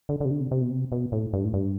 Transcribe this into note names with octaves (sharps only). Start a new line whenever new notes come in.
D3
D3
C3
D3
C3
C3
B2
C3
B2
A2
G2
A2
G2